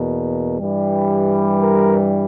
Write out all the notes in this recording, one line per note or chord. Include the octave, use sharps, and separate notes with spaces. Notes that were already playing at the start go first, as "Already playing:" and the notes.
Already playing: E2 B2 A#3
G2 E3 G3
A#4